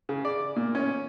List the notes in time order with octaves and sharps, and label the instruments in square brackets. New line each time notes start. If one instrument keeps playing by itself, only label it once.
[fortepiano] C#3
D5
A#2
C#4